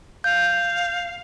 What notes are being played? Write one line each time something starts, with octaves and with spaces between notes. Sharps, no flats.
F5 G6